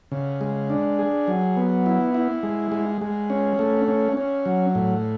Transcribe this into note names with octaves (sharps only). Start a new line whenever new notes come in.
C#3
G#3
D4
G#4
F#3
B3
E4
E4
G#3
G#3
G#3
C#4
A3
C#4
C#4
F#3
A2